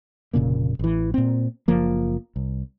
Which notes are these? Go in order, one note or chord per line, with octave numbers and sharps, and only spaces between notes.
F1 A#2 C#3 A#3
A1 E3
A#2 C4
F#1 F3 A#3
C2